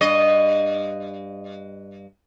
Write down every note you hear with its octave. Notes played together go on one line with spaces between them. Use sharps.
G2 D#5